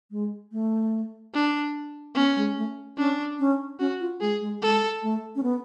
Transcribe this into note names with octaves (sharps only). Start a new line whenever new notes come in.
G#3
A3
D4
B3 C#4
G#3
A3
C#4 D4
C#4
C#4 F#4
F4
G#3 G#4
G#3
G#3 A4
A3
C#4
B3